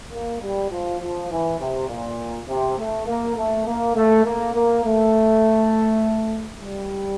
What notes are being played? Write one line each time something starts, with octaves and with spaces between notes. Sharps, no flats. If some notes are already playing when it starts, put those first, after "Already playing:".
A#3
G3
F3
F3
E3
C3
A#2
C3
A3
A#3
A3
A#3
A3
A#3
A#3
A3
G3